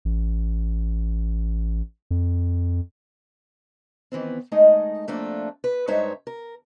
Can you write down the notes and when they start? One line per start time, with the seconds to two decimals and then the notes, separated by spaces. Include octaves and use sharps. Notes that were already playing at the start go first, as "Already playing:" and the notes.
0.05 A1
2.11 F2
4.12 D#3 E3 B3 C4
4.52 G#3 A3 D#4 D#5
5.08 F2 A3 A#3 D4 F4
5.64 B4
5.87 G2 G#3 D#4 C5 C#5 E5
6.27 A#4